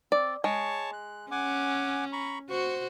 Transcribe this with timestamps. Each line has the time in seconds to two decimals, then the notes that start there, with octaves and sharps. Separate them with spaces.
0.12 C4 D5
0.44 G#3 C#5 A5 C#6
0.93 F#6
1.31 C#4 F#5 G#5 D6
2.13 A#5 B5 C#6
2.50 F#4 C5 C#6